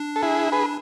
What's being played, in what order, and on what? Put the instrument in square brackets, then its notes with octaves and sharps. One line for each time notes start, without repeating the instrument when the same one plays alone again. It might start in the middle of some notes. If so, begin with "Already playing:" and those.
Already playing: [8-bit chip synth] D4
[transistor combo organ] A4
E4 G#4
G#4 B4